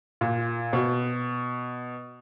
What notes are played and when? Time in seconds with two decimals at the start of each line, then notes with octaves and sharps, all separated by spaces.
0.21 A#2
0.73 B2